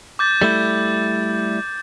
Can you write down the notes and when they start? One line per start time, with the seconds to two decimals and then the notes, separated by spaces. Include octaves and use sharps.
0.19 D6 G6 A6
0.42 G3 A3 E4